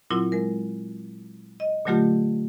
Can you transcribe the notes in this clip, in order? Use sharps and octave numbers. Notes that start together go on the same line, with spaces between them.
A#2 F#3 C4 E4 F4
G#3 A#4
D#5
A#2 D3 F#3 A3 F4 G4